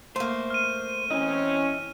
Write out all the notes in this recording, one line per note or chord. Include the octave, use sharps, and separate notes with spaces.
A3 A#3 C5
F6 D#7
E3 C4 C#4 E4 D#5